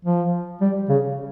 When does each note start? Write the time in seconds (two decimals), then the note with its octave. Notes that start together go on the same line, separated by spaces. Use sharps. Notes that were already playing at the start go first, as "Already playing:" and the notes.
0.05 F3
0.61 G3
0.89 C#3